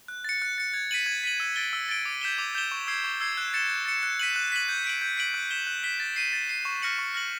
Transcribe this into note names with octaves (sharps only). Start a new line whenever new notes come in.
F#6
A6 C#7
F#6
A6 C#7
G#6
B6 D#7 F#7
G#6
B6 D#7 F#7
E6
A6 D7 G7
E6
A6 D7 G7
D6
G6 B6 E7 G7
D6
G6 B6 E7 G7
C#6
E6 G#6 C7
C#6
E6 G#6 C7
F#6
A6 C#7 E7
F#6
A6 C#7 E7
F#6
B6 D#7 F#7
F#6
B6 D#7 F#7
G6
B6 D7 F#7
G6
B6 D7 F#7
F#6
B6 E7 G7
F#6
B6 E7 G7
A6
C7 D#7
A6
C7 D#7
C#6
F6 A#6 C#7 F#7
C#6
F6 A#6 C#7 F#7